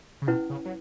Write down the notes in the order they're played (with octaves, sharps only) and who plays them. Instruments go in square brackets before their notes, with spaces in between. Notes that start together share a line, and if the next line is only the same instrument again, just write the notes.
[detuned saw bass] C#3
[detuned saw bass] B2 [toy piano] C#4 E4 B4 F#5
[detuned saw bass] C#3
F#3